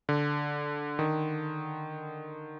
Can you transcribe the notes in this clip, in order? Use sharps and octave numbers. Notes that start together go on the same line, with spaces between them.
D3
D#3